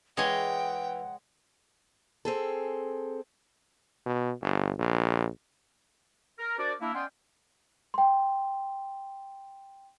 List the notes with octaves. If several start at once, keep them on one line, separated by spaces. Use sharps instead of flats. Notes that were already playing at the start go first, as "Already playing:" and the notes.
E3 G#3 C#5 D#5 F#5 G5
C4 G#4 A4
B2
G1
A#1
A#4
D4 F#4 A#4 C5 D5
A#3 D4 E4
B3 C#4 D5 D#5 G5 C6
G5 C6